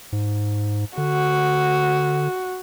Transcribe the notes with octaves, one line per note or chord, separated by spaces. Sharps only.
G#2
D3 F#4